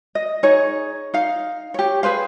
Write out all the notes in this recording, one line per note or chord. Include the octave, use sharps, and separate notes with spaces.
D#5
D#4 G#4 C#5
D#4 F5
G4 C#5
G#4 B4 C5 F5